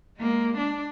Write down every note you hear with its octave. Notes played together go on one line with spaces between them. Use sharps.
G#3 A#3
D4